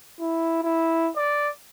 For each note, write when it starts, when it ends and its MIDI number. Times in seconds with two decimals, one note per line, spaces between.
0.20 0.60 64
0.63 1.10 64
1.17 1.50 74